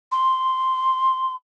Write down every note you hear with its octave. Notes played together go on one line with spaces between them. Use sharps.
C6